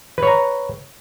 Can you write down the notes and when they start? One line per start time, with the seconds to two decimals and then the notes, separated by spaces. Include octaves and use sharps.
0.18 B4
0.23 C#5
0.27 A#5